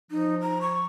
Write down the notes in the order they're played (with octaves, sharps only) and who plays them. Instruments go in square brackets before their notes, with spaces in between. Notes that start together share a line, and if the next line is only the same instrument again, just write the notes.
[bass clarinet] F3 [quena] D#4
[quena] A#5
C#6